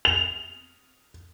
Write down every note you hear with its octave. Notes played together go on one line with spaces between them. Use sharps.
F7